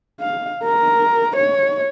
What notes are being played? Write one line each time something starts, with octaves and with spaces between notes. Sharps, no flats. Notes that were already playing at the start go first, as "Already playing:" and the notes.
F5
A#4
C#5